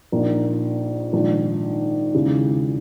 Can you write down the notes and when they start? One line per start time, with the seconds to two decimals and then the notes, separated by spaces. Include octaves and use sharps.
0.12 A#1 A#2 A#3 D#4
1.13 A#1 G#2 D#3
2.14 E1 D#2 C#3 E3